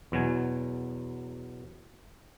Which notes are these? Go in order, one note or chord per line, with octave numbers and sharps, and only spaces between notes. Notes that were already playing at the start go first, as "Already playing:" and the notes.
E2 B2 F#3 G#5